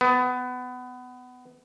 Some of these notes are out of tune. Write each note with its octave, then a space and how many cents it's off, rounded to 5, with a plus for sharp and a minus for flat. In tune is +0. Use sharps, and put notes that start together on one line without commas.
B3 +20